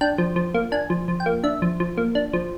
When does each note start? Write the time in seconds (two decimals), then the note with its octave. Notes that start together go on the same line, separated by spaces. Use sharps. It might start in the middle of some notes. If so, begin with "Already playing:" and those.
0.01 D4 G5
0.18 F3
0.36 F3
0.54 A#3
0.72 D4 G#5
0.90 F3
1.08 F3
1.20 G5
1.26 A#3
1.44 D4 E5
1.62 F3
1.80 F3
1.97 A#3
2.15 D4
2.33 F3